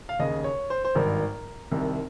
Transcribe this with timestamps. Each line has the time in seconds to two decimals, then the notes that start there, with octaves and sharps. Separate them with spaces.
0.09 F5
0.19 D#2 C#3 D#5
0.44 C#5
0.70 C5
0.85 C5
0.95 G#1 G2 D#3 A#4
1.71 C2 C3 D#3